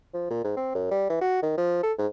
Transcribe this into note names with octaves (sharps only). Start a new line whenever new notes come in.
F3
A#2
G#2
C4
F#2
G3
E3
F#4
D#3
F3
A4
G#2